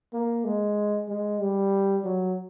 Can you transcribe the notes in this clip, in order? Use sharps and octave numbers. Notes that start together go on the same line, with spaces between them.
A#3
G#3
G#3
G3
F#3